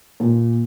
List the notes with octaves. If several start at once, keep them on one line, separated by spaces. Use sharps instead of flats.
A#2